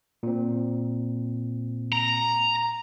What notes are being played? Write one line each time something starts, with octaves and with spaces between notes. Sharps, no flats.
A#2 C4
A#5